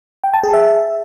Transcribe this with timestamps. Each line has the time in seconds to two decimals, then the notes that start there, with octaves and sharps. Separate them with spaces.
0.24 G5
0.34 A5
0.43 G#4
0.53 E5